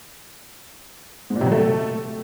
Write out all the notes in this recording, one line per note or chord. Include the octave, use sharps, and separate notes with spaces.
G#2
A#2
C3
F#3
A3